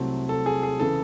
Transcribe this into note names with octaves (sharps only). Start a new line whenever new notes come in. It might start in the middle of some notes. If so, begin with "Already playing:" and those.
Already playing: C2 C3 F#3 A3 C4
A4
G#4
G#4
C#3 E3 A4